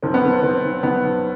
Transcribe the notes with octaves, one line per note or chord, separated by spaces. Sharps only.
B1 C4
B3
C4
B1 C4
B1 B3